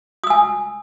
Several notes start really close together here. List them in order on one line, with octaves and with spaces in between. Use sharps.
D#6 E6 G#5